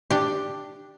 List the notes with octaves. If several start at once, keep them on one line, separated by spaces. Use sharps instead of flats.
D4 G4